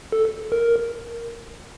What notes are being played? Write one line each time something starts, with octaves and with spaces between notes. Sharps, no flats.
A4
A#4